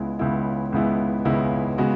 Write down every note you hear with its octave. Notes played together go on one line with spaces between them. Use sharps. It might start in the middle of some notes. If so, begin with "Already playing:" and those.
Already playing: C#2 C#3 G#3 B3 E4
C#2 C#3 G#3 B3 E4
C#2 C#3 G#3 B3 E4
C#2 C#3 G#3 B3 E4
C#3 G#3 B3 F#4